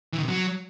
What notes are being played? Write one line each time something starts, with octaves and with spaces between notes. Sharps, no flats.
E3
D#3
C3
F#3